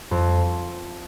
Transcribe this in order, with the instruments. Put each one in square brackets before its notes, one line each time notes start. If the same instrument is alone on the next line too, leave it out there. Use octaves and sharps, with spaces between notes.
[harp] F2